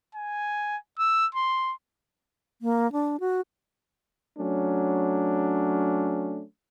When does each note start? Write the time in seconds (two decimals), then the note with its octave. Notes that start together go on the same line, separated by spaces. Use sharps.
0.15 G#5
0.98 E6
1.35 C6
2.62 A#3
2.92 D4
3.20 F#4
4.38 F#3 A3 C#4 D4